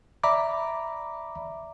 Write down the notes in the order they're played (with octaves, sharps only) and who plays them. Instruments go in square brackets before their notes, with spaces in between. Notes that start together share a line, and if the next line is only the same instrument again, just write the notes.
[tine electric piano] D5 E5 A#5 B5 D6